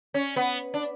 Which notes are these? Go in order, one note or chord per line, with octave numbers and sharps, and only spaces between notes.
C#4
B3
D4